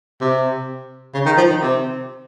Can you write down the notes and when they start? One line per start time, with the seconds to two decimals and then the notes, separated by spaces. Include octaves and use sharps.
0.21 C3
1.14 C#3
1.26 D#3
1.37 F3
1.49 D#3
1.61 C3